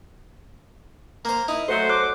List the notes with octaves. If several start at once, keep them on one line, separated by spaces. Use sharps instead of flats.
A#3 C5 A#5
D#4 E4
F#3 A3 A4 C5
D6 F#6